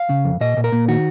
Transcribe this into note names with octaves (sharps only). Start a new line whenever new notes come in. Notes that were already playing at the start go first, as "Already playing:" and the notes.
Already playing: F5
C#3
F2
A#2 D#5
A#2
A#4
A#2
D#3 F#4